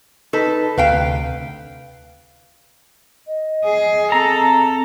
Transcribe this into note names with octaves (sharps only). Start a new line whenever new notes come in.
D#4 A4 B4
D2 C3 B4 F5 G5
D#5
G#4
C4 A4 A#5